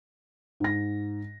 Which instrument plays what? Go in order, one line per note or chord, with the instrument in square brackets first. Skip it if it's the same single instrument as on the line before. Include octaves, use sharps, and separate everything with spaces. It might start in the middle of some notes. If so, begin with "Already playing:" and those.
[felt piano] G#2 A#6